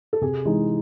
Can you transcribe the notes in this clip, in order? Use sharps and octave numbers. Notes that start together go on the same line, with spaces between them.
A4
C3 G#4
E3 G#3 D#4